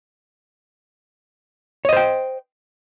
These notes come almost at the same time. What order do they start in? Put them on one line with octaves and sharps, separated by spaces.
C#5 D#5 C5 G5